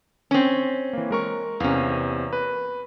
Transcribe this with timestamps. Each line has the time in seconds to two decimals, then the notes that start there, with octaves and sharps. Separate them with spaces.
0.31 C4 C#4
0.93 E3 A#3
1.11 G#3 A#4 C#6
1.60 E2 C3 A#3 C#4
2.33 B4